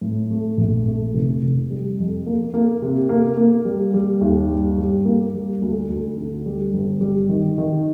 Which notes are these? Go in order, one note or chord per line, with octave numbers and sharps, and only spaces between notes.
A2
A3
A#1
A3
F1
F1
G3
F2
A#3
A#3
C3
A#3
A#3
G3
G3
D#2
G2
G3
A#3
G3
D2
D2
D3
G3
G1
G3
D#3
D#3